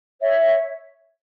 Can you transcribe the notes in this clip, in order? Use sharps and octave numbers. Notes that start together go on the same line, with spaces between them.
C#5 E5